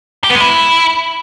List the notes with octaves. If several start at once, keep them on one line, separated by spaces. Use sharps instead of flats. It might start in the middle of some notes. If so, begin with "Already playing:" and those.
G4
B3
G#3
E4